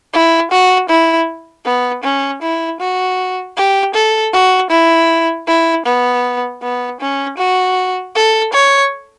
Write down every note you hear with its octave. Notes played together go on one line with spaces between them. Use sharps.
E4
F#4
E4
B3
C#4
E4
F#4
G4
A4
F#4
E4
E4
B3
B3
C#4
F#4
A4
C#5